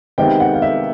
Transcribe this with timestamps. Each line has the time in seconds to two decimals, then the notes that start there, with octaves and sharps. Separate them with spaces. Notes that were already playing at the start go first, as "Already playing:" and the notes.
0.18 C3 D#3 G#3 B3 G5
0.40 F#5
0.54 F5
0.62 E5